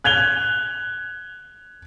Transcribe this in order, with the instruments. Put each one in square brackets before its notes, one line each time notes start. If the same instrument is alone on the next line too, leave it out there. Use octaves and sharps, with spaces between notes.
[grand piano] F#6 G#6 F7 G7